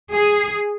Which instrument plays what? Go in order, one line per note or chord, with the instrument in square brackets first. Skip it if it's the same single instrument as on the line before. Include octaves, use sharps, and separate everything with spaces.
[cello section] G#4